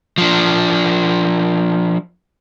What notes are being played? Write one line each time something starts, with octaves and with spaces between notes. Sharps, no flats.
F3 D4